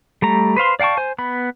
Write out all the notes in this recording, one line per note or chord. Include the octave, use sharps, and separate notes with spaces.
G3 A3 A#5
B4 C5 F5 C6
D5 F5 G5 A5 C#6
C5 G#5
B3 B5